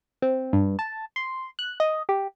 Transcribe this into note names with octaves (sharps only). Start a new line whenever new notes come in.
C4
G2
A5
C6
F#6
D#5
G4